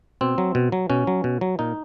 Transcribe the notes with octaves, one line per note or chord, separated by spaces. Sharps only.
B2 C4
F#3
B2
F#3
B2 C#4
F#3
B2
F#3
A#2 D#4